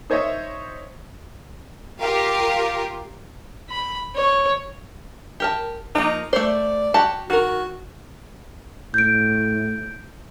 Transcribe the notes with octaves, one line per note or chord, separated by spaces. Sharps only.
D#4 C5 C#5 D#5 E5
F4 G4 A#4 F5
B5
C#5
G4 A#4 A5
F3 A#3 D#4
A3 C5 D5
F#4 G4 A5
D#3 F#4 A#4
A2 G6 D7